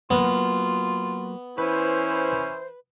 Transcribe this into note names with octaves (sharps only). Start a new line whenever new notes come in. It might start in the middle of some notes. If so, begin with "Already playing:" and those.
F#3 A#3 B3 F4 F#4
E3 C#4 E4 B4 C5